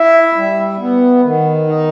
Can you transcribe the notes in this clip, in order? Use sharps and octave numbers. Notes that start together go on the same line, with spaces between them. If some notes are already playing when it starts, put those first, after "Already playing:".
Already playing: E4 E5
G3
B3
D#3
D#4